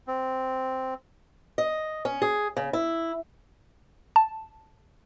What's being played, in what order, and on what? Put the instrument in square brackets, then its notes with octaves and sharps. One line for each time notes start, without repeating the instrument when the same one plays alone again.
[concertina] C4
[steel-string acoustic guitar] D#5
C#4
G#4
C#3
E4
[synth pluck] A5